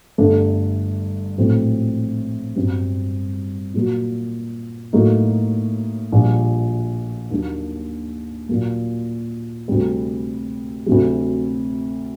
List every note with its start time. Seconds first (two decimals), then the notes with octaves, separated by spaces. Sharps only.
0.18 G1 G2 D3 A3 D4
1.38 A#1 A2 F#3 C4
2.56 G1 G2 F#3 C4
3.74 A#2 F#3 A#3 F#4
4.93 A2 F#3 A#3 D#4 F#4
6.12 A#1 A#2 G3
7.30 D#2 D#3 F#3 A#3 D4
8.49 A#2 F#3 A#3
9.68 D2 C3 G3
10.86 D2 C3 F#3